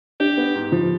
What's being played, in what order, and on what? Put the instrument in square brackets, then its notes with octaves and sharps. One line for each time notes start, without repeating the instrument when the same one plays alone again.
[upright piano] D4 [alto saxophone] G4
[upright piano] B3
G#2
F3